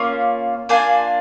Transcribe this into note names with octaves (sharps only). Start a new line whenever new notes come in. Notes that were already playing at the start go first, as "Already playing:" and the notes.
Already playing: A#3 C#4 F4
A#3 D4 F4 G#5